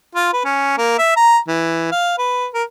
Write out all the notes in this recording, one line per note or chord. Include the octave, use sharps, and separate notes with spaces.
F4
B4
C#4
A#3
E5
A#5
E3
F5
B4
A#4